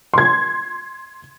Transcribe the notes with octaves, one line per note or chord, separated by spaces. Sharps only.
C6 G#6